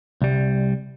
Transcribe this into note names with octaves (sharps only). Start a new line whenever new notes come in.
C2 G3